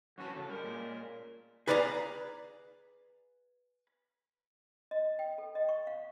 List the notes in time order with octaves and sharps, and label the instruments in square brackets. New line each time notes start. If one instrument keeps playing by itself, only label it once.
[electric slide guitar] F#2 E3 A5 [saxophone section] C#4 F#4
[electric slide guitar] C#3 [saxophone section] A3 C#4 A4
[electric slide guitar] G3 [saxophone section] G#3 C#4 A#4
[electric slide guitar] A#2
[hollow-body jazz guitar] G#4 B4 D5 F5 G#5 A#5
[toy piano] D#5
G5
A4
D#5
C#6
F5